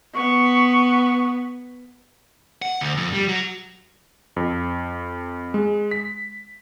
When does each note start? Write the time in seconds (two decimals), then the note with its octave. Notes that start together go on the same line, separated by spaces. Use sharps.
0.15 B3 C#6
2.62 F#5
2.81 D2
2.97 F2
3.13 G3
3.28 F#3
4.36 F2
5.54 G#3
5.91 B6